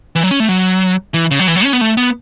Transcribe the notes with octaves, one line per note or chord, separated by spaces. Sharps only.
E3
F#3
C#4
A3
F#3
E3
C#3
F#3
E3
F#3
C#4
B3
A3
B3